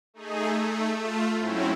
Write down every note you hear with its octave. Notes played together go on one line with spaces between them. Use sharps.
A3 D#4 G#4
A3
A3 F4
G#2 F#3 C4 C#4 E4